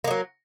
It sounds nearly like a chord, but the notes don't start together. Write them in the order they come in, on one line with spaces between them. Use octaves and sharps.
A#3 G#3 F#3